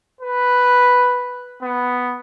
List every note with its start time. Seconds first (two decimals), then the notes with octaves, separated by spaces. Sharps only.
0.21 B4
1.63 B3